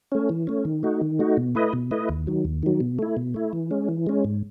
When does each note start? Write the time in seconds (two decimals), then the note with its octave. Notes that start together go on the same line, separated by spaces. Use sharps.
0.12 A3 C#4
0.29 E3
0.47 A3 C#4
0.65 D#3
0.83 A3 D#4 F#4
1.01 D#3
1.19 A3 D#4 F#4
1.37 B2
1.55 A3 E4 B4 D#5
1.73 B2
1.91 A3 E4 B4 D#5
2.09 D#2
2.27 D#3 F#3
2.45 D#2
2.63 D#3 F#3
2.80 B2
2.99 A3 E4
3.17 B2
3.34 A3 E4
3.53 E3
3.71 G#3 C#4
3.88 E3
4.07 G#3 C#4
4.24 G#2